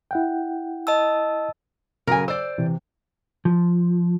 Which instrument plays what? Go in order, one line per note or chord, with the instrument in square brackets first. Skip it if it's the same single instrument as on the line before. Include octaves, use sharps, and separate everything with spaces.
[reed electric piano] E4 F#5 G5
[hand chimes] D#5 A5 E6
[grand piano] C#3 F#3 [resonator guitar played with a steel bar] A#4 G#5
[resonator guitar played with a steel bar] C5 D5 [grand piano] E6
[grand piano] C3 [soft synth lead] E3
[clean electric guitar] F3